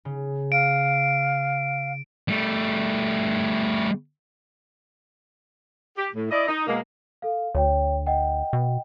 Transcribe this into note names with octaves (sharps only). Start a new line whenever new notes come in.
C#3
F5 D7
G3 A3
G4
A2
E4 D5 D#5
D#4
B2 G#3 A#3
A4 F5
D2 C#5 G5
D#5 F#5 G5
B2